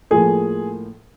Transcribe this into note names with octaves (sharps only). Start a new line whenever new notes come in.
A2 F3 A#3 G#4